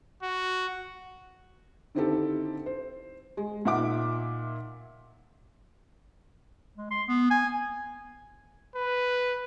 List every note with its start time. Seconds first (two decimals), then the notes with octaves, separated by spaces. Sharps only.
0.22 F#4
1.95 D3 D#3 C4 E4 G4 A4
2.66 C5
3.37 G#3
3.65 A#2 D#4 E5 F#5 D6
6.77 G#3
6.91 C6
7.08 B3
7.31 G#5
8.75 B4